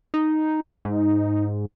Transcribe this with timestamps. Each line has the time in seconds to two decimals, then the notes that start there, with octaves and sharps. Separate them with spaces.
0.14 D#4
0.85 G#2 D#4